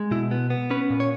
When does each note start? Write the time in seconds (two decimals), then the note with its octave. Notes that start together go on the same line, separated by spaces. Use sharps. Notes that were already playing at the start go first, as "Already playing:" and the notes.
Already playing: G#3
0.11 B2 E4
0.31 B3
0.50 B3
0.70 C#4 B4
0.90 A#2
1.00 C#5